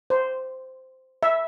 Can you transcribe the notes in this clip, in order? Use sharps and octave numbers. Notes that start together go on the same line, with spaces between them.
C5
E5